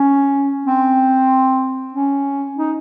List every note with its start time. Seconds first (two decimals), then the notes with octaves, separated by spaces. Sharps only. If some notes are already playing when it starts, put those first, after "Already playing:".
Already playing: C#4
0.66 C4
1.94 C#4
2.57 D#4